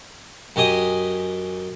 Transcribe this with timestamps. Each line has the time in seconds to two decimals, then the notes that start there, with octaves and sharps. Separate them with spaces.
0.56 F#2 G4 D#5 G#5 D#6